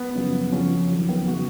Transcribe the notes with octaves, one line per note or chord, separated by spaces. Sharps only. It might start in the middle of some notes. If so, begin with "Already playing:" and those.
Already playing: B3
F#2 C#3 F3
F2 C#3 F3 C#4
F2 D#3 F#3
B3
C#3 F#3 F#4